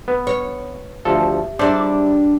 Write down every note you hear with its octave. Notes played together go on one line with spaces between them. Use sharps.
B3 B4
B4 C#5
D2 F3 G4 A4 E5
G3 D4 E4 G#4 A4 C5 E5 D6
F4 D6